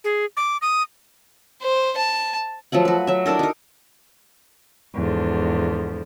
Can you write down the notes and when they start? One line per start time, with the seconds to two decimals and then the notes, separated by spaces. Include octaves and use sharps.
0.04 G#4
0.37 D6
0.62 D#6
1.62 C5
1.97 A5
2.72 F3 F#3 A3 F#5
2.85 F#4 B4
3.07 F#3 E5
3.26 D4 E4 A4 A#4
3.39 D#4 A#4
4.94 E2 G#2 D3 F3